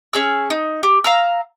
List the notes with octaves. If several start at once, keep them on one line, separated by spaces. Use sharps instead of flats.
C#4 G#4 E6
D#4
G4
F5 A#5 E6